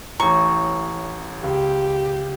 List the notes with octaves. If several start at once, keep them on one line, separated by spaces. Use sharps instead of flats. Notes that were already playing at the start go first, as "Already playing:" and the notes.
A1 A2 A#5 C#6
C#2 G4